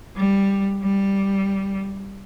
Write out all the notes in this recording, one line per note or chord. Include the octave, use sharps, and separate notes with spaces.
G3
G3